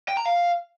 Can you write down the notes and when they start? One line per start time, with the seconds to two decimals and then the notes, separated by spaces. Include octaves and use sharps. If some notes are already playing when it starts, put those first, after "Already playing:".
0.09 G5
0.17 A#5
0.26 F5